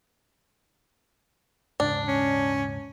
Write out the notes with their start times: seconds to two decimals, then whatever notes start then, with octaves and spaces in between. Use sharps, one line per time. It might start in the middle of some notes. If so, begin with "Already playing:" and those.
1.80 D#1 G#2 C#3 D4
2.08 C#4